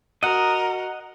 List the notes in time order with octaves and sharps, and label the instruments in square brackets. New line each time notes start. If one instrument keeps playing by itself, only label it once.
[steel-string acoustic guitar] F#4 [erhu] A#4 [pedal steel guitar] D#5 F#5